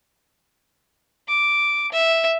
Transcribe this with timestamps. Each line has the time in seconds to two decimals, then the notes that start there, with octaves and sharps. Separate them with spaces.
1.28 D6
1.92 E5